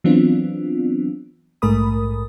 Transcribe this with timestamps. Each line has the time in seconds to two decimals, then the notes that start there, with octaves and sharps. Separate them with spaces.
0.04 E3 F#3 B3 C4 D4 F4
1.62 A#1 G#2 A3 A#4 B5 D#6